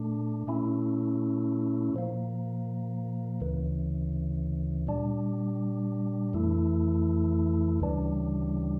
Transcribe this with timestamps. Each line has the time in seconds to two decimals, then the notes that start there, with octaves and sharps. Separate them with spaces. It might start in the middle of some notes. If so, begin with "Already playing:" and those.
Already playing: A#2 A3 D4
0.47 A#2 A3 C#4 E4
1.94 A#2 F3 A#3
3.41 D2 C#3 E3
4.87 A#2 G3 D4
6.33 F2 E3 A3 E4
7.80 D2 C#3 E3 G3 D4